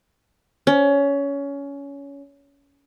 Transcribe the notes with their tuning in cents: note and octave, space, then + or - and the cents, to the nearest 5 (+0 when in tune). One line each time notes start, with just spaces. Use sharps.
C#4 +20